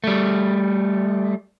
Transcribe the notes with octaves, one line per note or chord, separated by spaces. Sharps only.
G3 A3